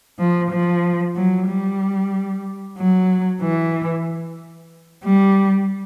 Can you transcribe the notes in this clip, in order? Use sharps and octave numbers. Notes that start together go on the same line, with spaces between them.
F3
F3
F#3
G3
F#3
E3
G3